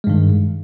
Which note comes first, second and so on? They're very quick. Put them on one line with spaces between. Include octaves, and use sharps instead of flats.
G#3 G2 D#3